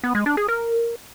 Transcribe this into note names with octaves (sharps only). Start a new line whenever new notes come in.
B3
G#3
D4
G#4
A#4